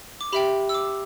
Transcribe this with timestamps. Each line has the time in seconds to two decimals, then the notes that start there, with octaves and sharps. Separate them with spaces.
0.21 D6
0.32 G4 E5 G5 B5
0.69 E6
0.74 D6